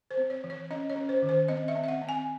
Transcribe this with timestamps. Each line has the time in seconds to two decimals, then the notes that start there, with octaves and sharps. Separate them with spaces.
0.11 C5
0.17 C4
0.30 C#5
0.44 E3
0.50 C#5
0.71 C#4 D#5
0.90 C#5
0.96 C#4
1.09 C5
1.22 D#3
1.29 C5
1.48 C4 D#5
1.68 E5
1.75 C4
1.84 E5
1.88 F#5
2.02 C4
2.09 G#5